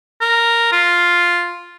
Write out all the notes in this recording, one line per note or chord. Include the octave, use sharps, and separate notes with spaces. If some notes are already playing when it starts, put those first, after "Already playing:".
A#4
F4